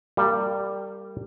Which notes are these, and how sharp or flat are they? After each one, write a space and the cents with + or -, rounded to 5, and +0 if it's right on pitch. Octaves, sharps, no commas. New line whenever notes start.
G3 +0 A#3 -30